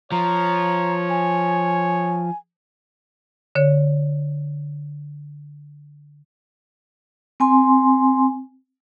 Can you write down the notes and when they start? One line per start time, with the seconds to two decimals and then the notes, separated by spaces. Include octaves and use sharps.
0.12 F3 C#5 A#5
1.10 G#5
3.55 D3 C#5
7.40 C4 G#5 C6